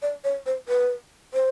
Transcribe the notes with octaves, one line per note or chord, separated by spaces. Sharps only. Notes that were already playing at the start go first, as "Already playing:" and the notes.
D5
C#5
C5
B4
C5